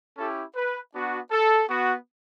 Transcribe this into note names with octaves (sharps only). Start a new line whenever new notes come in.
C#4 E4 G4 A4
B4
B3 D4 F#4
A4
B3 F#4